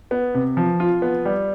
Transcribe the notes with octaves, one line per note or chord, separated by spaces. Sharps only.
B3
C3
F3
F4
B3
G3